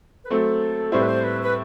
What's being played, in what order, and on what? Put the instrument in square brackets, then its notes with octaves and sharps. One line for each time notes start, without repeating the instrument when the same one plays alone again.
[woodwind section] B4
[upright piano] F#3 A3 C4 [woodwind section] A4
[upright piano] A2 G3 C4 E4 [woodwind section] C5
[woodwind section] B4
C5
B4
B4